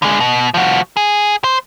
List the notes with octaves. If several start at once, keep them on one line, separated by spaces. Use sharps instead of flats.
D3 G#3
B2
F3 F#4
G#4
C5